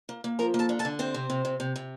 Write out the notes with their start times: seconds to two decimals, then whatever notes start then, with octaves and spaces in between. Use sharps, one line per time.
0.09 A#3
0.24 A#3
0.39 F3 A#4 A#5
0.54 A#3
0.59 A4 A5
0.69 D3
0.79 A4 A5
0.85 D3
0.99 C3 C4 C5
1.14 C3
1.30 C3
1.45 C3
1.60 C3
1.76 C3